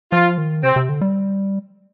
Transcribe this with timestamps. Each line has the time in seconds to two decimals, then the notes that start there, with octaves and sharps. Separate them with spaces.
0.12 F3 F4
0.38 D#3
0.63 C3 C4
0.76 C3
0.89 D3
1.01 G3